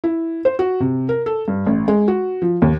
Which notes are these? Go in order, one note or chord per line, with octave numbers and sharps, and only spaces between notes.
E4
C5
F#4
C3
A#4
A4
G2
A1
G#3
F#4
F3
D#2